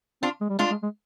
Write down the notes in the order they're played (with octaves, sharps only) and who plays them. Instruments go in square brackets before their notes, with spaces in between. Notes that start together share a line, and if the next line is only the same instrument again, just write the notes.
[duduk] C4 [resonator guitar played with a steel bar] D4 F4
[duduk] G#3
G3
[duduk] G#3 [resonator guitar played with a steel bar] D4 F4
[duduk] G#3
G#3